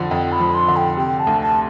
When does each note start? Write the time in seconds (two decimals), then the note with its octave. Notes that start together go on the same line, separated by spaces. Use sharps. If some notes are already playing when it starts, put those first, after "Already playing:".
Already playing: F2 D3 F3
0.11 F2 G5
0.32 B5
0.40 F3
0.55 C6
0.68 D3
0.76 G5
0.97 C3 G5
1.20 A5
1.27 D2
1.42 A5